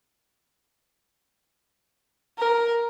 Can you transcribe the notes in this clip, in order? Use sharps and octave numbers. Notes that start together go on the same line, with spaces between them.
A#4